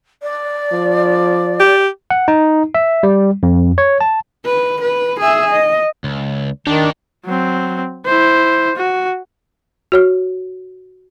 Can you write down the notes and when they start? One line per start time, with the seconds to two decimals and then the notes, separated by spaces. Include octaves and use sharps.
0.23 D5
0.72 F3
1.60 G4
2.10 F#5
2.28 D#4
2.75 E5
3.03 G3
3.43 F2
3.78 C#5
4.01 A5
4.46 B4
4.81 B4
5.20 G#4 E5
5.52 D#5
6.04 C#2
6.67 D#3 D4 D#4 G4
7.25 F#3 C4
8.05 E4 C5
8.76 F#4
9.92 F#4 C#5 F6